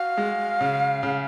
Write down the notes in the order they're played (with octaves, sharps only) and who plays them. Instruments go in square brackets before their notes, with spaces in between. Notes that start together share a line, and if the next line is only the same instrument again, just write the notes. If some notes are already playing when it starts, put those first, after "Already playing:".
Already playing: [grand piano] F#4 [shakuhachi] F5
[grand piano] G#3
C#3
C#3